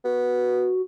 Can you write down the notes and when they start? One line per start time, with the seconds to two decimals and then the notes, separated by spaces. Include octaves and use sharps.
0.05 B3 F#4